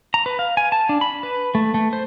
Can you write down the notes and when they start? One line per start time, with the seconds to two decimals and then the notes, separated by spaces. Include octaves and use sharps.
0.14 A#5
0.26 B4
0.39 F5
0.57 G#5
0.72 A5
0.89 D4
1.01 B5
1.23 B4
1.55 A3
1.74 A3
1.93 C5